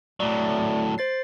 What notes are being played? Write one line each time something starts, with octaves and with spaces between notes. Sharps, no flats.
A2 F#3 A3 D5
C5 A6 C7